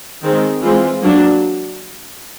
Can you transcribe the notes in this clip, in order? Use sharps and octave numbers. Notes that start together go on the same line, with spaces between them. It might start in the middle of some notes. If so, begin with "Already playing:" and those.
D#3 G#3 C4
E3 G#3 C4 F4
F#3 A#3 D4